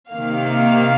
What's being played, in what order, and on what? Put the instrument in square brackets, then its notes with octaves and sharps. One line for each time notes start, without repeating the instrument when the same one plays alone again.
[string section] C3 D#3 A#3 F5